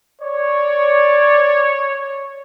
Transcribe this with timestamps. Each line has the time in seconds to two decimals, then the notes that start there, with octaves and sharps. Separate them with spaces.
0.22 C#5 D5